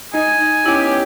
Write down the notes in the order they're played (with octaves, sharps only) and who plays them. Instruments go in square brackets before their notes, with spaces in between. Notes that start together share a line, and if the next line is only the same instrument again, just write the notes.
[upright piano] D#4 [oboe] G#5
[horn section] B3 C#4 G4 [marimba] E4